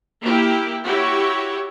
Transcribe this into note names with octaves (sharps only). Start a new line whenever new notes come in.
A#3 E4 G4
E4 F#4 G4 C#5